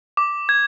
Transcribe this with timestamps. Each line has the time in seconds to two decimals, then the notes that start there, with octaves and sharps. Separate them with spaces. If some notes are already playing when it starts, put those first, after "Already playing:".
0.17 D6
0.49 G#6